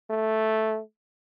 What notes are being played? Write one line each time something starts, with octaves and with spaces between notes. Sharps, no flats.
A3